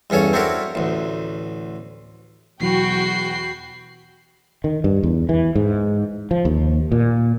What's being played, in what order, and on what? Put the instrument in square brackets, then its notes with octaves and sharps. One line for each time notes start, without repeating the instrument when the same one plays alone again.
[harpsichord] E2 G2 C#4 A4 C#5
C4 D4 E4 F#4 A4 A#4
A1 D2
[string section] E2 F#4 G5 [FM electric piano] B2 E3 F#3 [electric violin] B5 C7
[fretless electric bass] D#3
G2
E2
E3
G#2
F3
D#2
A#2